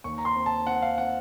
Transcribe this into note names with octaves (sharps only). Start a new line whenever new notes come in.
D#2 C#6
A#5
C6
C4
A5
C4 F#5
F5
C4 F#5